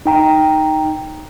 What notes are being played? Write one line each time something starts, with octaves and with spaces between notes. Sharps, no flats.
D#4 G5 A#5